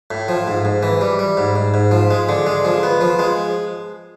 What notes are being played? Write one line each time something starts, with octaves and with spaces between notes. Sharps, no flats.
A2
F3
G#2
G#2
E3
G3
G3
G#2
G#2
G#2
F3
G#3
D3
G#3
F3
B3
F3
G#3